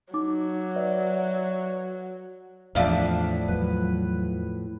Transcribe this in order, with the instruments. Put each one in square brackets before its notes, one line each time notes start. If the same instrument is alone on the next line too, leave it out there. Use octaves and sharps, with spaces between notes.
[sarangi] F#3 [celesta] D#4 D6
[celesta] B4 D5 E5
[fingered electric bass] E2 [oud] A2 F3 D5 [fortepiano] D4 E5 F5
[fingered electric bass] E2 F#3 [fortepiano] B4